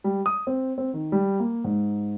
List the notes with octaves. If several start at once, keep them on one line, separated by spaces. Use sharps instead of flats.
G3
D#6
C4
C4
D#3
G3
A#3
G#2